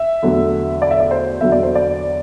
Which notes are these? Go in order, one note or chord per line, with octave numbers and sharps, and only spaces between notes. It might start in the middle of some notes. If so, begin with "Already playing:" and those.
Already playing: E5
E2 D3 F#3 A3
D5
E5
D5
C5
E2 D3 F#3 E5
D5
C5
D5